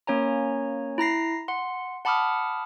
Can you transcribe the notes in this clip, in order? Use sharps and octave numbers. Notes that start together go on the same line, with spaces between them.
A#3 C#4 C#5 G#5 A#5
E4 A#5 A#6 C7
F#5 C6
F#5 A5 B5 D6 D#6 F6